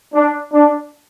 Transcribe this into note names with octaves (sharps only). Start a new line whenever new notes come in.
D4
D4